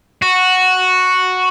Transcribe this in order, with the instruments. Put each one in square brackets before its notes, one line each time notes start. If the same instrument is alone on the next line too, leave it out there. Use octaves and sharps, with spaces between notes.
[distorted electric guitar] F#4